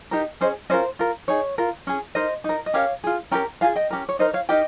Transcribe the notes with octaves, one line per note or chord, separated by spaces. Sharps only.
D#4 G4 A#4
C#4 G#4 C5 D#5
C#4 F4 A#4 C5 D#5
F4 A#4
D#4 G#4 C#5
F4 A#4
C#4 G#4
D#4 A#4 C5 D#5
D#4 A#4
D#5
C#4 G4 A#4 C#5 F5
F4 G#4
C#4 G4 A#4 G5 A#5
F4 G#4 F5 G#5
D#5 G5
C#4 G4 A#4
C#5
D#4 A#4 C5 D#5
C#5 F5
D#4 G4 A#4 D#5 G5